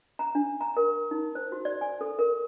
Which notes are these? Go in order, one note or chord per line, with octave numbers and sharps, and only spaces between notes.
A#5
D4
A#5
A#4
D#4
C5
F#4
D5
G#5
A4
A#4